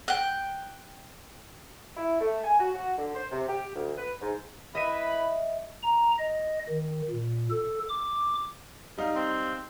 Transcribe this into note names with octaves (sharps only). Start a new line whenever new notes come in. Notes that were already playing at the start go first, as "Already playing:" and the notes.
G5 F#6
E4
A3
G#5
F#4
F#4
D3
C5
C3
G4
D2
B4
G#2
E4 B4 D#5 E5 B5 D#7
A#5
D#5
D#3
A#2
A4
D6
G3 D#4 F5
C4